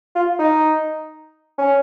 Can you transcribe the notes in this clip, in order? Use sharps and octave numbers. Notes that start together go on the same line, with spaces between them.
F4
D#4
C#4